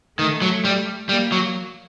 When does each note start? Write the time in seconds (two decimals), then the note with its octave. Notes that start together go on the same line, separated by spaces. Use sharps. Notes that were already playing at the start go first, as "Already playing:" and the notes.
0.18 D#3 A3
0.41 F#3
0.65 G3
1.09 G3 A#3
1.32 F#3